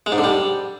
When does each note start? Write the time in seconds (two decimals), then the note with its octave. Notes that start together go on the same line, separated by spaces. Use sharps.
0.06 G#3
0.12 G#2
0.18 D3
0.24 G3